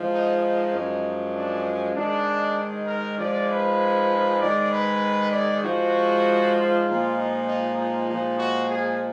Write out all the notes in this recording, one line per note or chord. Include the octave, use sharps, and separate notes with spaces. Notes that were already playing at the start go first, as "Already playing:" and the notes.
Already playing: G#2 F3 G#3
D#4
D#4
F#2 F3 G#3
D4
G#2 D#3 G#3 D4
A#4
G#2 F3 G#3 D5
B4
G#2 D#3 G#3 D5
B4
D5
G#2 F3 G#3 F#4
F4
A#2 F3 G#3
D#4
D#4
D#4
A#2 F3 G#3
F#4
G#4